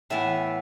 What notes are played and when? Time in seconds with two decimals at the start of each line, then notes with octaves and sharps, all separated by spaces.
0.10 A2 E3 B3 E5